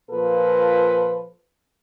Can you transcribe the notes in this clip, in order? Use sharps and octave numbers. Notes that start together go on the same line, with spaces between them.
A#2 F3 A4 B4